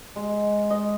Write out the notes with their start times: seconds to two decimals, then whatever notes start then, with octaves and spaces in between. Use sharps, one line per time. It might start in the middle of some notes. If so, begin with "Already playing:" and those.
0.16 G#3
0.70 D#5